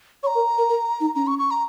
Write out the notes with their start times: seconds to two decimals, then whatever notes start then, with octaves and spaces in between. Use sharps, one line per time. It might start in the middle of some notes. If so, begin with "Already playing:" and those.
0.23 C#5 C#6
0.27 A#5
0.35 A#4
0.58 A#4
0.69 A#4
1.00 D#4
1.15 C#4 A#5
1.27 C#6
1.39 C#6
1.51 A#5